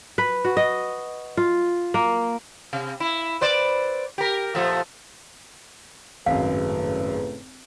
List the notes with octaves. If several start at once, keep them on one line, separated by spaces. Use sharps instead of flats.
B4
F#4
D#5
F4
A#3
C3
E4
B4 C5 D5
G4 A#4
A#2 F3 A3
G#1 F#2 A2 C#3 B4 F5